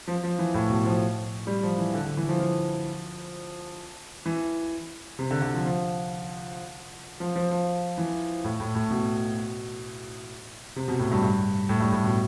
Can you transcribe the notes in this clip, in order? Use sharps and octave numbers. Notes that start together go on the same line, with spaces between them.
F3
F3
E3
A2
B2
F3
G3
F3
E3
D3
D3
E3
F3
F3
E3
C3
D3
D3
F3
F3
F3
F3
F3
E3
A2
A2
A2
B2
C3
B2
A2
G2
G2
A2
G2
A2
B2